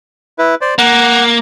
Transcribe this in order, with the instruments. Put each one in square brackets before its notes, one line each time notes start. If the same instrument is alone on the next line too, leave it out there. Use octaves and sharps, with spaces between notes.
[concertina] E4 B4
C5 D5
[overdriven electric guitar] A#3 [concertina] F#5